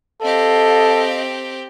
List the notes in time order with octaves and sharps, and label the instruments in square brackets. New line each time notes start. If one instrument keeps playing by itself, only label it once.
[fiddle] C4 G4 [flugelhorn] A4 [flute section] D#5 F5